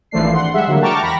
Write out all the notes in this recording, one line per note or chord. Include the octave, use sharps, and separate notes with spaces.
G#1 E3 F3 A3 D4 C7
F#5 C6
G3 G#3 E5 F#5
D3 F#3 A#3
G5 A5 A#5 C#6 D6 F6
E2 B5 A#6